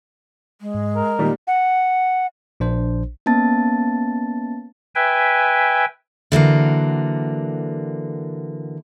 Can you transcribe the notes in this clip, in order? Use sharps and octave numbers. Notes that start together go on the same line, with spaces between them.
G#3
G#2
A#4
A#2 D#3 G3 D#4
F#5
A#1 D4 C5
A#3 B3 C#4 A5 A6
B4 E5 G5 G#5
D3 E3 F#3 A#3